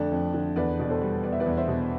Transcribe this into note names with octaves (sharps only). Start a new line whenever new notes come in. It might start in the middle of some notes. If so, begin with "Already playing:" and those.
Already playing: F2 D3 A3 D4
F2
D3
E2 B4 D5
B2 D5
A4 C5
G3
B3 D5
E5
B4 D5
E2
C5 E5
B2